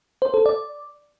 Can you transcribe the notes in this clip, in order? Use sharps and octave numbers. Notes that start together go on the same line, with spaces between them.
C5
A4
D5